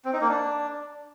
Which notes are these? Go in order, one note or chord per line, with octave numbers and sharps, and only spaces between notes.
C4
D#4
A#3
D4